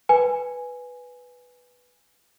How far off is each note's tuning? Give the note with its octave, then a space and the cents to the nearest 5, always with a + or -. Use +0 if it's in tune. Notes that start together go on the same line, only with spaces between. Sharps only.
B4 +0 G#5 +0